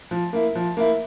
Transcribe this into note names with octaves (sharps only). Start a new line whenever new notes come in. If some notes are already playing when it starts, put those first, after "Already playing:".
F3
A#3 E4
F3
A#3 E4